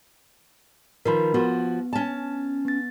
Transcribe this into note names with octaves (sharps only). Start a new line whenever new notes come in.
D#3 F3 A#4 B4 B5
F3 B3 F#4
C#4 A5
B3 A6